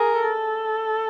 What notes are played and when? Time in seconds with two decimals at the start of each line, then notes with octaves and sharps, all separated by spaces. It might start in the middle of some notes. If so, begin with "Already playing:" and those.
Already playing: G#4 A#4
0.23 A4